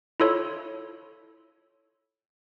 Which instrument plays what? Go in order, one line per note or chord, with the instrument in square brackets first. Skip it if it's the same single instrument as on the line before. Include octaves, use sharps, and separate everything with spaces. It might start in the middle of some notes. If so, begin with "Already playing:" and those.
[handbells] E4 F4 A4 C#5